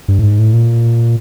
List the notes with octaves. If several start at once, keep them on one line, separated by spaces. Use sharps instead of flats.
G2
A2
G#2
A2
A#2